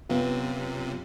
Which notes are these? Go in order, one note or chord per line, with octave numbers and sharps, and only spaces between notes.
F#2 C3 B3 F4